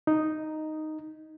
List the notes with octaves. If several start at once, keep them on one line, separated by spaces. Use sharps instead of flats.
D#4